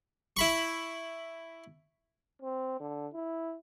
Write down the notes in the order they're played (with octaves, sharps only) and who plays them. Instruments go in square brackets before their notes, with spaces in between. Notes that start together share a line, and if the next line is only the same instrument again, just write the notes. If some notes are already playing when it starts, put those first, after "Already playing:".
[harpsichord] E4 B5 C#6
[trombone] C4
D3
E4